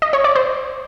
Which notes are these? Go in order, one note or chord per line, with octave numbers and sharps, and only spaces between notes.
D#5
C#5
D5
C5